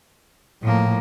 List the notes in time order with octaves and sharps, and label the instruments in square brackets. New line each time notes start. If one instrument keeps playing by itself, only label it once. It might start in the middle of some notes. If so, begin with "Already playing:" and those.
[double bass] A2 [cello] F3 A#3